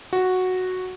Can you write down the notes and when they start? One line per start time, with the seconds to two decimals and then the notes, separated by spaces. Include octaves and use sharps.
0.13 F#4